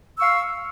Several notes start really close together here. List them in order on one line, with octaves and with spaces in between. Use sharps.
E6 C#6 F5